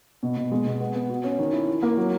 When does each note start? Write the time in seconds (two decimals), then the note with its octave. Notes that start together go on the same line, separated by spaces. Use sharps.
0.23 B2
0.37 B2
0.51 G#3
0.66 B2
0.80 B3
0.95 B3
1.09 F#4
1.24 C#4
1.39 D#3
1.53 E4
1.68 E4
1.83 A#3
1.97 F#3